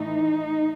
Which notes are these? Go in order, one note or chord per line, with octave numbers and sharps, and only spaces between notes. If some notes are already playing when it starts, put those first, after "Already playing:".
Already playing: A2 E3 A3 D#4